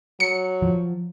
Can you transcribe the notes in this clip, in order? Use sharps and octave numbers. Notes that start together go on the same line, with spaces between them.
F#3 C#7
F3